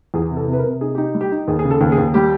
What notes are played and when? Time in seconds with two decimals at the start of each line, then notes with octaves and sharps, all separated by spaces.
0.14 E2 G#4
0.30 C3
0.37 A4
0.47 C3
0.53 B4
0.59 A#4
0.64 C3
0.81 D#4 G#4
0.95 D#4 G4
1.15 G3
1.21 G4
1.32 D#4
1.48 D#2 G#4
1.59 G#4
1.65 C#3
1.71 A4
1.81 D#2
1.92 G#4
1.98 D#2
2.14 G3 G4